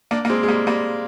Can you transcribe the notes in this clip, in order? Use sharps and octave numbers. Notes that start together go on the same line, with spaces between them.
A#3 D4
A#3
G#3 C4
G#3
G3 A#3
G3 A#3